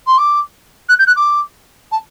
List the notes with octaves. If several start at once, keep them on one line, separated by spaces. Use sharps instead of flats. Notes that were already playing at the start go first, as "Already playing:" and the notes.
C6
D6
F#6
G6
F#6
D6
A5